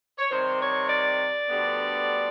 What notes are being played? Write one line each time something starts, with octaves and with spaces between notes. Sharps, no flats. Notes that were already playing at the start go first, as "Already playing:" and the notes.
C#5
C3 D#3 G3 C5
C#5
D5
D2 D3 G3 B3